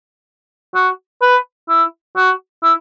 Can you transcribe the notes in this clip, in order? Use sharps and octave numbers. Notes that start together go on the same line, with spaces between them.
F#4
B4
E4
F#4
E4